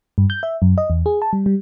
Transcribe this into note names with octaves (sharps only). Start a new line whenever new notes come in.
G2
G6
E5
F#2
D#5
E2
G#4
A5
G3
G3